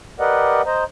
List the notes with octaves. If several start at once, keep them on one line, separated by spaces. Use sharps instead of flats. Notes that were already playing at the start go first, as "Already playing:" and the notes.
G4 A#4 B4 D5 D#5 F#5
C5 D#5 A#5